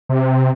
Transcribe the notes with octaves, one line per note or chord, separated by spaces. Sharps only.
C3